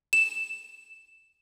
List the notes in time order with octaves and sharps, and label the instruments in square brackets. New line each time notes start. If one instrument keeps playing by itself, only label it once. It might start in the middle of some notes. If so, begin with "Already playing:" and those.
[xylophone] E7